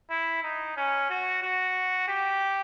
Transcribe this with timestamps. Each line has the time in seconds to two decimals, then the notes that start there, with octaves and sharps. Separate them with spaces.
0.11 E4
0.43 D#4
0.77 C#4
1.10 F#4
1.42 F#4
2.08 G4